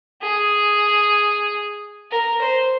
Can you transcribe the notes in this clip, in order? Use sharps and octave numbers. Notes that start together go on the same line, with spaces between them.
G#4
A#4
C5